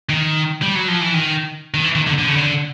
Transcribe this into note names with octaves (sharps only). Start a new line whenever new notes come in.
D#3
G3
F#3
F3
E3
D#3
D#3
E3
D#3
D3
D3
C#3
D3